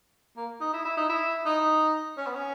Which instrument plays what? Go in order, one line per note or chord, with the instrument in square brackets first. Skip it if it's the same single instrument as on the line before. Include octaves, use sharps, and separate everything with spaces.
[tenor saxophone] A#3
D#4
E4
E4
D#4
E4
D#4
C#4
B3
C#4